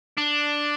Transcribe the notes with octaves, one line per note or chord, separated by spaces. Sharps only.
D4